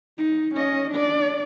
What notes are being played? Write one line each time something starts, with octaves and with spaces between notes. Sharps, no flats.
D#4
C#4 D#5
D4 D5